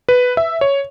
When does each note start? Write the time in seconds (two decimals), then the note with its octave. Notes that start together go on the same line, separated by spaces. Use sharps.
0.09 B4
0.37 E5
0.61 C#5